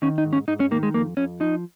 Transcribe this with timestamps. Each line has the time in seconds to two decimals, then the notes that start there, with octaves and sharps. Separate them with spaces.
0.02 D#3 C#4
0.18 D#4
0.25 G#2
0.33 C#4
0.48 G#2 D#4
0.60 C#4
0.71 D#3 A#3
0.83 G#3
0.94 F2 A#3
1.17 F2 C#4
1.40 F3 D#4